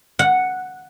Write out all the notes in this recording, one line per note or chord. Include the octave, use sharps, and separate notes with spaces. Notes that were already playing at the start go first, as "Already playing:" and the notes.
F#5